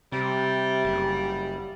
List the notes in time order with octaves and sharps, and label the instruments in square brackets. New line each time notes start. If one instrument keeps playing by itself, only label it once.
[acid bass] C3 [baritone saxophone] G3
[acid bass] F#1